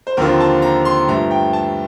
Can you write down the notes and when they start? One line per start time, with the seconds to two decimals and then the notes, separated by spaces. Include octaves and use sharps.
0.07 C5
0.17 D#2 D3 F3 C4 F4 A#4
0.40 A5
0.62 A#5
0.85 C6
1.08 G2 F3 A3 A#5
1.31 G5
1.53 A5